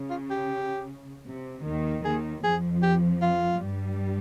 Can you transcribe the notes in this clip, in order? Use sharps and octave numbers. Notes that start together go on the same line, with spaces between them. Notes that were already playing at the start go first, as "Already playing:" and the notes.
Already playing: C#3
F4
G4
C3
D#2 D#3
D#2 D#3 G#4
F2 F3 G#4
G4
F4
G2 G3